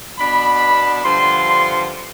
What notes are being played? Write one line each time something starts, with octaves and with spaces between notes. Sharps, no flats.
B2 B3 D4 B5
G2 D3 F3 C6